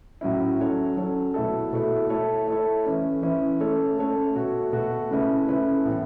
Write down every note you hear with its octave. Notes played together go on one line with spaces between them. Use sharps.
A2 F#3 C#4 E4
F#3 C#4 A4 C#5
F#3 C#4 A4 C#5
B2 A3 E4 A4
B2 A3 E4 A4
A3 E4 A4 C#5
A3 E4 A4 C#5
E3 C#4 E4
E3 C#4 E4
A3 C#4 A4 C#5
A3 C#4 A4 C#5
B2 A3 F#4
B2 A3 F#4
C#3 A3 C#4 E4 B4
C#3 A3 C#4 E4 B4
A2 E3 B3